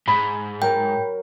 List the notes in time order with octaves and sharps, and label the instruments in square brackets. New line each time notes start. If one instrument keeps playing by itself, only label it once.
[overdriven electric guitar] G#2 [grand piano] B5
[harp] F#3 A#4 [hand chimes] G5